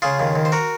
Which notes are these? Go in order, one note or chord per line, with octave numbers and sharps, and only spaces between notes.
C#3 F4 G#4
D#2
D#2
C5
F#4 A#4